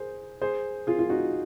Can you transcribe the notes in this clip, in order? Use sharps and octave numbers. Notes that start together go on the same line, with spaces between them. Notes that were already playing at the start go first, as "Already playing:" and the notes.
Already playing: G#4 C5
G#4 C5
F4 G#4
F4
D#4 F#4